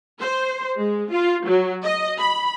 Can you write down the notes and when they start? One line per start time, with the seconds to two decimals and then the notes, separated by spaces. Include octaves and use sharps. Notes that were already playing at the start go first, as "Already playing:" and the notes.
0.21 C5
0.78 G#3
1.10 F4
1.45 F#3
1.84 D#5
2.20 B5